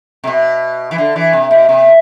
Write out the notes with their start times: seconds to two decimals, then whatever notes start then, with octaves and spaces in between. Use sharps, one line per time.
0.24 C3
0.27 B2
0.91 E3
0.98 D3
1.16 E3
1.33 C3
1.51 B2
1.69 C3